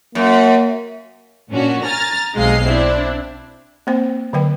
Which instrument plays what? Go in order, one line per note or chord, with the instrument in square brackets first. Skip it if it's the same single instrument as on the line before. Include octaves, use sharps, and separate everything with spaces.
[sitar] F#2 [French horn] A#3
[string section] A#2 C#4 D4 F#4
G#5 A#5 F6 A6 A#6
B1 C3 G#3 D#5 F5 C7
C4 D4 E4
[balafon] A#3 C4 C5 G5
D3 F#3 B4 G5